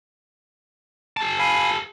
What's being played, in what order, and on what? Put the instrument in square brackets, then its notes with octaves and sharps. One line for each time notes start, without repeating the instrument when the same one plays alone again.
[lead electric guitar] G#4 A5
[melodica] F5 G#5 B5